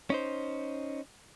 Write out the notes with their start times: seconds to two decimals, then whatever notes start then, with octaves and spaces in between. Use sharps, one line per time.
0.10 C#4 D#4 C5